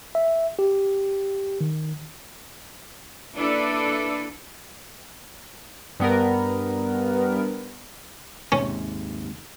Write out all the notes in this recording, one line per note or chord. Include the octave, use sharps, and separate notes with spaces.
E5
G4
D#3
A#3 D4 E4 A4 B4 D5
G2 B3 A#4
D#2 G#2 C3 C#4